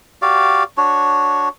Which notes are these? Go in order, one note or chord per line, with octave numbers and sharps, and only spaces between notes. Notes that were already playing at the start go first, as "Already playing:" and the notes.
F#4 G4 D5 F5
D4 F#4 C#5